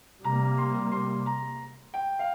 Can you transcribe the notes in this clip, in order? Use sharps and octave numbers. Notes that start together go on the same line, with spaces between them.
C3 G3 A#3 A#5
C6
C6
A#5
G5
F5